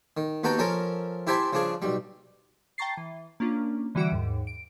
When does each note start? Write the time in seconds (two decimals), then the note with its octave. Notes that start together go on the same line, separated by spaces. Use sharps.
0.17 D#3
0.44 D#2 B3 F#4 A4 G5 A#5
0.59 F3 C#4 A4 A#4
1.27 E4 G4 C5 E5 G#5 A5
1.53 C#3 F3 D4 G#4
1.82 B1 G3
2.78 G5 A5 A#5 C#6 A6 C7
2.97 E3
3.40 A#3 C#4 D4 F4
3.95 D3 E3 G3 F#4 E5 D7
4.12 D#2 G#2
4.47 D7